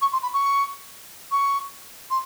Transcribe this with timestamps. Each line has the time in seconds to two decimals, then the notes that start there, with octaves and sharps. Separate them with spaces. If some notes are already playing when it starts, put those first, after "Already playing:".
0.01 C#6
0.12 C6
0.22 B5
0.33 C#6
1.31 C#6
2.10 C6